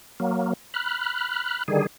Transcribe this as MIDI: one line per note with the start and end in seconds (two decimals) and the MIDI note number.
0.20 0.53 54
0.20 0.53 58
0.74 1.63 83
0.74 1.63 89
0.74 1.63 90
1.68 1.86 50
1.68 1.86 51
1.68 1.86 55
1.68 1.86 68